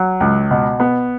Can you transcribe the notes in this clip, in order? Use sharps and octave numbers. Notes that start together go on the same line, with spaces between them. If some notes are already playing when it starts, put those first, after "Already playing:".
Already playing: F#3
C#2
B2
B3